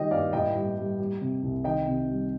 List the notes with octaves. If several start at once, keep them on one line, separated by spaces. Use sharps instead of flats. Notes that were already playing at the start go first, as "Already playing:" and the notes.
Already playing: D#3 G3 D#5 G5
G2 D5 F5
A2 D#5 G5
G3
G3
G3
C3
C2
D#3 D#5 G5
C3
G3